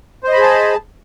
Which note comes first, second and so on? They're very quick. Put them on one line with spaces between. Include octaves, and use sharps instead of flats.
C5 D#5 B5 G#4 A5